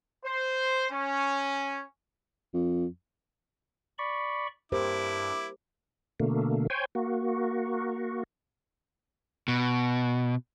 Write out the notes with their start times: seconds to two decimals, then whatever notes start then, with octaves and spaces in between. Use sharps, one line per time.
0.25 C5
0.91 C#4
2.54 F2
3.98 D5 B5 C#6
4.72 G2 E4 G4 A#4 C5 D6
6.20 B2 D3 A3 A#3
6.70 C5 C#5 G5 G#5
6.95 A#3 F#4
9.48 B2